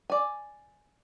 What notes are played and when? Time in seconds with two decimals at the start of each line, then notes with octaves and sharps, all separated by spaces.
0.10 D5 G#5